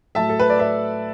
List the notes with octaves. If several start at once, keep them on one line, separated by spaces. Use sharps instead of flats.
A2 F#3 A3 E5 A5
A4
B4
D5
B4 E5